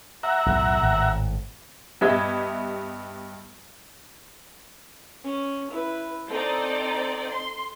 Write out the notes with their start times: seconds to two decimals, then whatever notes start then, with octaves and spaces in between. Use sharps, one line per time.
0.23 E5 F#5 A#5
0.46 B1 E2 A2
0.81 G#1 A2
2.01 G2 B3 G4 D#5 E5 G#6
5.24 C#4
5.71 E4 B4
6.29 C4 D#4 A4 D5
7.30 C6